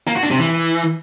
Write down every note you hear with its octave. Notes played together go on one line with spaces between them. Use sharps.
A#3
F#4
D4
C3
E3